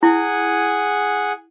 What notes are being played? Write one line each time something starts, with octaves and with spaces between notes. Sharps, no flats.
E4 G#4 F#5 G#5